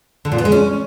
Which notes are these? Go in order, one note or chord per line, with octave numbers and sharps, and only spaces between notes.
D3
A#2
B3
G#3
C#4